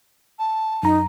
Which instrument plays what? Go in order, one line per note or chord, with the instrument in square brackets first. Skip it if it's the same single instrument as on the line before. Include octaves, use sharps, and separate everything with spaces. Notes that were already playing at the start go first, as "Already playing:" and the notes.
[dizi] A5
[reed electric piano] F#2 A#5 [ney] D#4